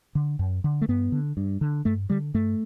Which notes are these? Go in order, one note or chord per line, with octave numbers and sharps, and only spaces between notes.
D3
F#2
D3
A3
G2 B3
D3
G2
D3
G2 A3
D3 G3
G2 A3